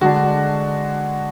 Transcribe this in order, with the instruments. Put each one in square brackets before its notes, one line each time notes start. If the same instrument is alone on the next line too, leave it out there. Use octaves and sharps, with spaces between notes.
[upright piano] D3 G#3 D4 F#4